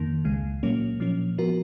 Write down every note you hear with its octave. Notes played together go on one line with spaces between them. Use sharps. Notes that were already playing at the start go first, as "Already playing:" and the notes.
Already playing: F2 D#3 A#3
C#2 C#3 G#3
A#2 F#3 A#3 C#4
A#2 F3 A#3 C#4
F3 B3 F#4 A#4